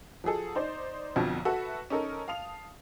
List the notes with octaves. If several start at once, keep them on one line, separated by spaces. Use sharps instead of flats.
F3 F#3 G#4 A4
D#4 C5 D5
B1 F2 B2 D3 F3 F#3
F#4 A4 B4 E5
C#4 D#4 A4 A#4
F5 A5 D#6 F7